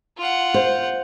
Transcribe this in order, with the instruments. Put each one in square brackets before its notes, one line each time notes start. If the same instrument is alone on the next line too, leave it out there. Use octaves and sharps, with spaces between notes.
[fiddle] F4 F#5
[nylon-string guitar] C5